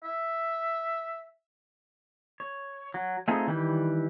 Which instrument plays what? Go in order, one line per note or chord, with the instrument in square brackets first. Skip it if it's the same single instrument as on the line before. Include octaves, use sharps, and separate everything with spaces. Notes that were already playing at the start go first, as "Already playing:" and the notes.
[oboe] E5
[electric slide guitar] C#5
F#3
A3 C4 D#4 F4 G#4
D#3 E3 G3 G4